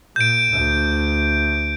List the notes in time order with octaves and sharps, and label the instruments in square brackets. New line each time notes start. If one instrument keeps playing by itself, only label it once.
[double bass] A#2 [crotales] G6 D7
[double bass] D2